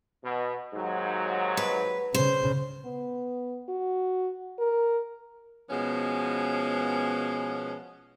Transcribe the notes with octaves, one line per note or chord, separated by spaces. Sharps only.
B2
D#2 G#2 F#3
B4
C#3 C5
B3
F#4
A#4
B2 F3 G#3 B3 C#4